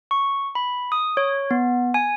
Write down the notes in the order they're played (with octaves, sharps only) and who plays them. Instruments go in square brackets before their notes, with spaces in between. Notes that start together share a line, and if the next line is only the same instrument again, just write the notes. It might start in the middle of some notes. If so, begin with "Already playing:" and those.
[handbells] C#6
B5
D#6
C#5
B3
G#5